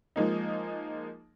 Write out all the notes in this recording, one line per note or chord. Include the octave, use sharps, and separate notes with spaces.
F3 G#3 A#3 D#4